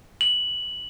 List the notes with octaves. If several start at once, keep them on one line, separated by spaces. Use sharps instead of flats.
F#7